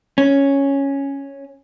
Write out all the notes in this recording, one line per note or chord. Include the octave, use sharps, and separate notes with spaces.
C#4